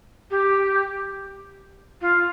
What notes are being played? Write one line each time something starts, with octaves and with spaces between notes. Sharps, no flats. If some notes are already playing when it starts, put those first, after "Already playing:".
G4
F4